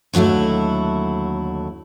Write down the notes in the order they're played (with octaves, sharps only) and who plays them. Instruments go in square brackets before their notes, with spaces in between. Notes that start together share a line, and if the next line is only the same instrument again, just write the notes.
[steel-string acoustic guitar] D#2 D3 F#3 A3 E4